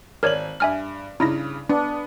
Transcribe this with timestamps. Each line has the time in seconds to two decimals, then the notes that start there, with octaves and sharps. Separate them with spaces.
0.23 G#1 A#4 C#5 D5 F#7
0.60 G2 E5 G#5 F6
1.20 G2 C#3 D#4 E4 A#6
1.70 B3 D4